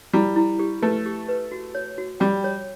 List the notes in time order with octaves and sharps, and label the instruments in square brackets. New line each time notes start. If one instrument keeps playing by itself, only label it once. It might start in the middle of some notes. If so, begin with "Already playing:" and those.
[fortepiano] G3 [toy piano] E4
[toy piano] E4
G4
[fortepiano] A3 [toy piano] B4
[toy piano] G4
B4
F#4
C#5
F#4
[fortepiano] G3 [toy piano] G5
[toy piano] C#5